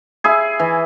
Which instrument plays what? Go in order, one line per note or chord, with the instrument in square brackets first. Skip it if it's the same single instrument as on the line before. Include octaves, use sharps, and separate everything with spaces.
[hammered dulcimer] E4 G#4
E3